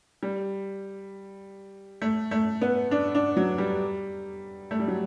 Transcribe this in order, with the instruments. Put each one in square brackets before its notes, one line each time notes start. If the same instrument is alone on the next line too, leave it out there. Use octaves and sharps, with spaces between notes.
[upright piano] G3
A3
A3
B3
D4
D4
F#3
G3
A3
G3
F#3